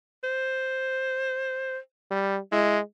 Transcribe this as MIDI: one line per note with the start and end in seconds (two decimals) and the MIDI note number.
0.24 1.78 72
2.10 2.39 55
2.52 2.80 56
2.52 2.78 64